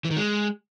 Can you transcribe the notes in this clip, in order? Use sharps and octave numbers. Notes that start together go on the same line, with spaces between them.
E3
D#3
G#3